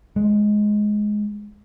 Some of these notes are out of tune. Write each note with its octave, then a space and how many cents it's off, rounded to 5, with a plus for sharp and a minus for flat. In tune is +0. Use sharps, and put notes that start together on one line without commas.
G#3 +10